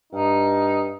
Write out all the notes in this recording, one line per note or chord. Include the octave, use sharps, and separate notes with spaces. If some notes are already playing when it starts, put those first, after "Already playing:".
G2 D#4